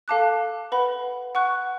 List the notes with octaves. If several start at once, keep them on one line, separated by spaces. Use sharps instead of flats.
A4 F5 A5 D6 F#6
B4 F#5 B5
F#5 C#6 F#6